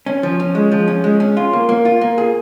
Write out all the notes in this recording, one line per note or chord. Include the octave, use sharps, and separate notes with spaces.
C#4
F3
C#4
G#3
F3
C#4
G#3
C#4
F4
A#3
A#3
F4
A#3
G#4